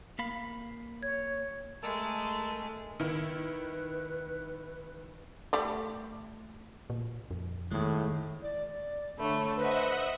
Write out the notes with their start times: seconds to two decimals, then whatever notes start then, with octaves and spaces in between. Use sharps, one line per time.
0.19 A#3 F5 B5
1.03 C#5 G#6
1.83 G#3 A3 A#4 A5 E6
3.00 D#3 E4 B4
5.53 G3 A3 D5
6.90 A#2
7.31 F2
7.71 D#2 A2 G#3
8.42 D5
8.73 D5
9.18 D3 A3 C#5 B5
9.57 B4 C5 D#5 E5 F#5